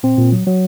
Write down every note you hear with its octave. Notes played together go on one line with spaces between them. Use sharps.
A#2 C4
A#2
F#3
F#3